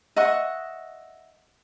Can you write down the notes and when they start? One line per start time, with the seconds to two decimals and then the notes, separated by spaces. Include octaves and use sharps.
0.16 D#5 E5 F#5 C#6